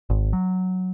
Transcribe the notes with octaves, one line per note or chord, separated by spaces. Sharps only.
G#1
F#3